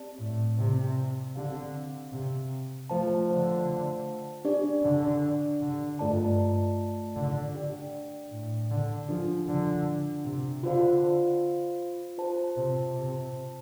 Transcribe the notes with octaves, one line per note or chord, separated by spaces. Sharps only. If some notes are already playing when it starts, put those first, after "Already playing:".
Already playing: C4 G4 D5 A5
A2
C3
D3 C4 G4 F5
C3
F3 A3 F4 C5 F5 A5
D3
D4 G4 D5
D3
D3
G2 A3 F4 A4 D5 A5
D3
D4 G4 D5 G5
A2
D3
F3 D4 F4 A4
D3
C3
D3 F4 C5 F5
F4 C5 A5
C3
C3